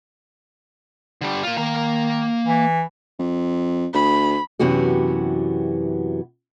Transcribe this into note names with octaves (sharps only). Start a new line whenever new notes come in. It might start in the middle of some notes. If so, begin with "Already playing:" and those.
D3 G3
A#3 F4
D#3 A#3 A#5
E3
F2
D2 B5
F#2 C3 E3 B3 F#4 G4